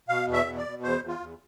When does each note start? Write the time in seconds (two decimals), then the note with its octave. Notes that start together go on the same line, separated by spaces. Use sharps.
0.09 B2 F5
0.27 E2
0.33 E5
0.46 B2
0.58 D5
0.64 B2
0.83 E2 C5
1.01 E2
1.08 F4
1.20 E2